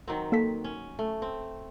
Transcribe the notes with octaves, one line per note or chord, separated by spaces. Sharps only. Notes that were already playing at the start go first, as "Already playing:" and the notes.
D#3 F#3 C4
A#3 A4 B6
C#4
A3
C4